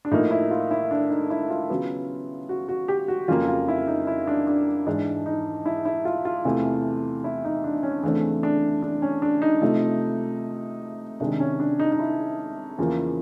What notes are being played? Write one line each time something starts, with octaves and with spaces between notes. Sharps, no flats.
D4
A2 F3 A#3 D#4
E4
F4
E4
D4
D#4
E4
F4
C#3 F#3 B3
F#4
F#4
G4
F#4
F2 C#3 F#3 A#3 F4
F4
E4
D#4
E4
D4
D4
G#2 E3 G#3 D4
D#4
E4
E4
F4
F4
E2 C3 E3 A3
E4
D#4
D4
C#4
E2 C#3 E3 A3 C4 D4
D4
D4
C#4
D4
D#4
C3 F3 A3
C3 D#3 G#3 D4
C#4
D4
D#4
D#4
E4
E2 C#3 F3 A#3